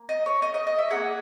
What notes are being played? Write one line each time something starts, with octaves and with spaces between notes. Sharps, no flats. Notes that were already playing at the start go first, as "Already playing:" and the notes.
Already playing: A#3
D#5
C#5
D#5
D#5
D#5
E5
D#4 G#4 F#5
A#3